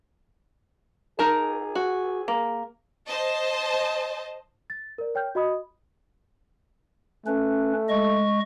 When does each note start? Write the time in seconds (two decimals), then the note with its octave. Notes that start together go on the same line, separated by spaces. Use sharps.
1.19 D#4 G#4 A#4 A5
1.75 F#4
2.28 A#3
3.08 C5 D#5 A5
4.70 A6
4.98 A#4 D5
5.15 C#5 G5 F6 G6
5.35 F#4 D#5 B5 D#6
7.26 A3 C#4 B4
7.89 G#3 D#5 C#6